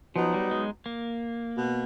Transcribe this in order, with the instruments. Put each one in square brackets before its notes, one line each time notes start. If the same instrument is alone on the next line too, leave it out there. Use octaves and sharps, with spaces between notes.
[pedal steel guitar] F3 [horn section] F#3 B3 D#4
[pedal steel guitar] G3
G#3
A#3
[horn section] B2